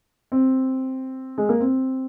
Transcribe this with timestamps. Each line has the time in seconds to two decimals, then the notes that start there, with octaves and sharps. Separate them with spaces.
0.32 C4
1.38 G#3
1.49 A#3
1.60 C4